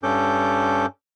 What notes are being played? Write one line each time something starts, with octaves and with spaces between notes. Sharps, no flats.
G2 C#4 A4 D6 G6